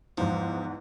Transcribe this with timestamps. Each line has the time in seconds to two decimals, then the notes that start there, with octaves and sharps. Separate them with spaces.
0.18 E2 G#2 F3